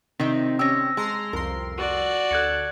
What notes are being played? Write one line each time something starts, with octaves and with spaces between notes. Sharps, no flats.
C3 D#3 C4 D#4 B6
C#4 G4 E6 A#6
G#3 A5 A#5 C6
C2 F2 A#4 C6
F#4 D5
D2 A4 F#6 G#6 C#7